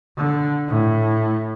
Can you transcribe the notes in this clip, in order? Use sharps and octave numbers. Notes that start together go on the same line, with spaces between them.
D3
A2